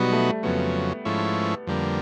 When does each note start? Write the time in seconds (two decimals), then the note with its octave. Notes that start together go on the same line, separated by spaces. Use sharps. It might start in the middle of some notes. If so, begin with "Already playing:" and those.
Already playing: B2 F#3 G3 B3 D#4 F#4
0.12 A3
0.43 F2 C#3 F#3 B3
1.05 G#2 F3 A3 C#4 E4
1.67 F2 D3 G3 A#3